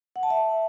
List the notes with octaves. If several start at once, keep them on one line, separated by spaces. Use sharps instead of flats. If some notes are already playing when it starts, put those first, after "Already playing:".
F#5
A5
E5